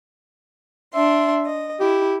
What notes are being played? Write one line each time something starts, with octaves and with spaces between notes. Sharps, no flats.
D4 E5 C6
D#5
E4 G4